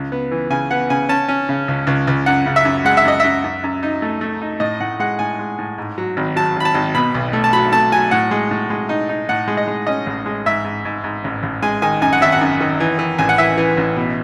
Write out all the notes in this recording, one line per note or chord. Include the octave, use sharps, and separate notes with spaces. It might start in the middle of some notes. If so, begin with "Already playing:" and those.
Already playing: C#2
B3
E3
C#3 G#5
B3 F#5
C#3 G#5
C#4 A5
C#4
C#3
C#2
C#2
C#2
F#2 F#5
C#3
E5
F#2
G#3 F#5
E5
F#2 D#5
F#2 E5
F#2
F#2
D#4
A3
A3
D#4
A2 D#5
A2 F#5
G#3 F#5
A2 G#5
G#3
A2
G#2
F#3
G#1
F#3 A5
G#1 B5
A5
G#1
B2 B5
B1
A3
A5
F#3 B5
A3 A5
F#3 G#5
A2 F#5
G#3
A2
G#3
D#4
D#4
A2 F#5
G#3
D#5
G#3
C#4 D#5
A1
G#3
G#2 E5
G#2
G#2
G#2
A1
A1
G#3 G#5
D#3 G#5
F#2 G#5
F#5
G#1 E5
F#5
F#2
D#3
E3
E3
A1 G#5
F#5
E3 E5
E3
A1
B2